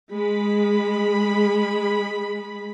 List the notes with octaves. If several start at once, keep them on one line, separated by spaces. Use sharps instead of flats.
G#3 B5